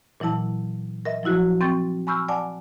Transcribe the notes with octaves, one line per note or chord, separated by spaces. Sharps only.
A#2 E3 F#3 E4 A5
A#4 D#5 E5
F3 F#3 E4 F#4
C4 G5 C#6 G6 A6
G#5 B5 C#6 E6 F6 G6
D5 F#5 G#5 A5 D6